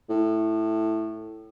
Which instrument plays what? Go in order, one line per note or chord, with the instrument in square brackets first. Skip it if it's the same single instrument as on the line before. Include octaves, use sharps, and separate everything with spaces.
[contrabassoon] A2